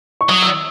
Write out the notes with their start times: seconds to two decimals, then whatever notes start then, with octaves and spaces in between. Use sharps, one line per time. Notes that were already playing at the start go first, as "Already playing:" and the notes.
0.21 C#6
0.29 F#3 D#6
0.42 E6